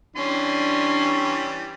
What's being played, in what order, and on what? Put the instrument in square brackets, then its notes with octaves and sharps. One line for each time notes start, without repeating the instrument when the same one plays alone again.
[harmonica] E3 G3 [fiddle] C#4 [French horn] D4 [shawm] C6